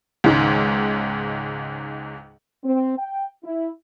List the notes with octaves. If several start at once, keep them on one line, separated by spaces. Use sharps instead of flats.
C#2 G#2 D#3
C4
G5
E4